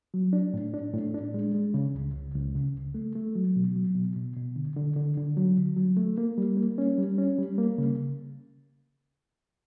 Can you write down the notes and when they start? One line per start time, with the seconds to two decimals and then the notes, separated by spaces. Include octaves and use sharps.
0.14 F#3
0.33 D4
0.54 A2
0.74 D4
0.94 A2
1.14 D4
1.34 G#3
1.54 G#3
1.74 C#3
1.95 C#2
2.14 C#2
2.34 C#2
2.55 C#3
2.74 C#2
2.94 A3
3.16 A3
3.35 F#3
3.56 B2
3.76 F#3
3.95 B2
4.16 B2
4.36 B2
4.56 D3
4.76 D3
4.96 D3
5.17 D3
5.37 F#3
5.57 D3
5.76 F#3
5.97 A3
6.18 A#3
6.38 G3
6.57 A#3
6.78 C#4
6.98 G3
7.18 C#4
7.38 G3
7.58 A#3
7.78 C#3